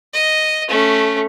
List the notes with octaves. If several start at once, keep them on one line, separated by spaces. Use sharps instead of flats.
D#5
A3 C#4